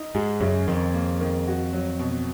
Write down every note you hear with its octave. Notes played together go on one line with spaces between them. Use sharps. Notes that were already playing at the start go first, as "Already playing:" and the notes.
Already playing: D#4
G#2 G#3
F#2 C#3
F2 D#3
A#3
D#3
F#4
F#3
B2